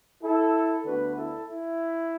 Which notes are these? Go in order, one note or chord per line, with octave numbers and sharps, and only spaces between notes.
E4 A4
D2 D3 B3 F#4 B4
E4 A4
E4